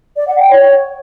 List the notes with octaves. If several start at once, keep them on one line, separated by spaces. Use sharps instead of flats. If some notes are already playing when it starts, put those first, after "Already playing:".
D5
F#5
G5
C#5